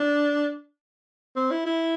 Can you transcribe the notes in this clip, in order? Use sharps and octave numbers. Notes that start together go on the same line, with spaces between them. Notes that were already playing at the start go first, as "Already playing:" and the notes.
Already playing: D4
C4
E4
E4